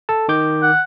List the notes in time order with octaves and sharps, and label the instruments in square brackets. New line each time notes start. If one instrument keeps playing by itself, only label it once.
[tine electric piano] A4 A5
D#3 D6 G6
[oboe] F#5